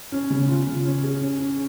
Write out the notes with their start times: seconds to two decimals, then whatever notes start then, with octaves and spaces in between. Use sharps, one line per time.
0.12 C#4
0.30 C#3
0.49 F4
0.67 C#3
0.85 C#4
1.03 G#4
1.22 C#4
1.40 C#4